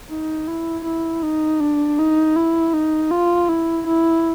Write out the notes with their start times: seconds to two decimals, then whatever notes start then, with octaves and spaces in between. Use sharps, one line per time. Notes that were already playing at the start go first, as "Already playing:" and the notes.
0.09 D#4
0.47 E4
0.85 E4
1.23 D#4
1.60 D4
1.98 D#4
2.36 E4
2.73 D#4
3.11 F4
3.49 E4
3.87 E4